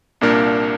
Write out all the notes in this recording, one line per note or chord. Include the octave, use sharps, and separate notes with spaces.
C2 A#2 A#3 D4 A#4